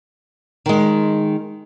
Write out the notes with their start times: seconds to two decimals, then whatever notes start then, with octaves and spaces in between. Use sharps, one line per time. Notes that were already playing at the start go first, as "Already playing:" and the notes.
0.66 D#3 G#3